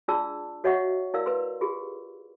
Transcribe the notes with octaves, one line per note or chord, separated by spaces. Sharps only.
D4 F4 G#4 D5 A5 E6
F#4 C#5 D#5 E5 F#5 C#6
E4 A#4 D5 F5 E6
B4 C6
F4 G4 G#4